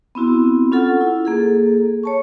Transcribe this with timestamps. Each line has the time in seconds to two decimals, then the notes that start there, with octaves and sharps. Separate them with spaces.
0.15 B3 C4 E4 F#4
0.72 C#4 F4 A4 F#5
1.01 E4
1.25 A#3 G#4 A4
2.04 C#5 A5 C#6